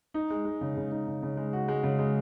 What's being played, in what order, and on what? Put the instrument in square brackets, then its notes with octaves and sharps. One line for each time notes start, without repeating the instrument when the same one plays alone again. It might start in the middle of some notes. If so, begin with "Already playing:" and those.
[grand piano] D#4
G#3
G#3
C#3
C#3
D#4
C#3
C#3
G#3
F#4
G#3
C#3
G#3